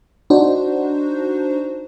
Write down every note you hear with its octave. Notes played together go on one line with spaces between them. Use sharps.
D4 D#4 F#4 C5